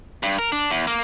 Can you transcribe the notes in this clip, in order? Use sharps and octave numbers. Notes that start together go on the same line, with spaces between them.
G2
A#4
D4
E2
A#3